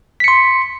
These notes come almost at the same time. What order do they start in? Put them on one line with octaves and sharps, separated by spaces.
B6 C#7 C6